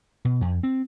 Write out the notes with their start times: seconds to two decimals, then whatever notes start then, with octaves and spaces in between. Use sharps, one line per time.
0.25 B2
0.41 F2
0.63 C4